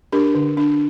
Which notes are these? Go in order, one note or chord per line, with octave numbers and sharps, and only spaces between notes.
D4 G4 A#4
D3
D4